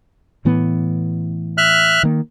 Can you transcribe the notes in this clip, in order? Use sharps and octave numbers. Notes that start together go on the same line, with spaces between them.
A2 E3 B3
E5 F6 F#6
D#3 A#3